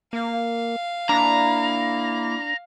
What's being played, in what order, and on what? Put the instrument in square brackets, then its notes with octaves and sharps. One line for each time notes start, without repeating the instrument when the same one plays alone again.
[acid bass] A#3 [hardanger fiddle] F5
[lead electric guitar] A#3 E4 [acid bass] D4 [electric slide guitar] A#5